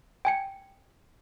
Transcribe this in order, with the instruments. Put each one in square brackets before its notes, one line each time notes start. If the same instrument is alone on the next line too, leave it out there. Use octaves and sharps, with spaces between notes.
[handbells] G5 G#5 C#7